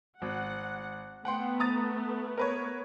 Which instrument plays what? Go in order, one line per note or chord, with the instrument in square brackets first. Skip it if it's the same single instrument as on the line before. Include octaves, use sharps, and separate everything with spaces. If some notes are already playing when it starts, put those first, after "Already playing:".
[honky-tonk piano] G#1 [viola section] F#5
[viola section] A3 B3 [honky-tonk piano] F#5 G5 C6
[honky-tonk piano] A#5 D#6 A6
A#4 B4 C#5